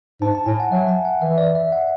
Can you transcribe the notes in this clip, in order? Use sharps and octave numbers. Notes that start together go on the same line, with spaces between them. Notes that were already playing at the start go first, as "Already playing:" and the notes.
G#2 A5
A5
A2 G#5
F#5
F#3 E5
G#5
F#5
E3 E5
D5
E5
F#5